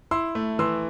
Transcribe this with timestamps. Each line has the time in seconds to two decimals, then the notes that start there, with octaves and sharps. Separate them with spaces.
0.11 E4 C6 E6
0.35 A3
0.59 E3 C6 E6